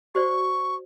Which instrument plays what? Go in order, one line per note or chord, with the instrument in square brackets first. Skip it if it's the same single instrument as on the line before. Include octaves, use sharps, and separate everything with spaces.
[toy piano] F#4 C5 D5 [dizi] C#6